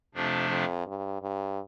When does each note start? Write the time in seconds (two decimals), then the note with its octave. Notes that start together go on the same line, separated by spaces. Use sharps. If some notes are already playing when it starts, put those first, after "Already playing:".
0.14 F2 C3 F3 A3 D4
0.50 F2
0.86 G2
1.22 G2